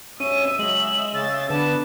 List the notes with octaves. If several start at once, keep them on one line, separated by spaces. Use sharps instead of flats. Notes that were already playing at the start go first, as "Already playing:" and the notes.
G2 B2 C#4 D#5 E5 D#7
C#3 F#3 G#3 F#7
C#3 A6
D3 B3 D4 B4 A5